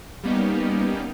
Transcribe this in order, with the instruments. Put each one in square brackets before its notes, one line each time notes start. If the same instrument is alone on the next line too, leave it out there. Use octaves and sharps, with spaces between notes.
[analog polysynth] G3 A#3 B3 C#4 D#4 G4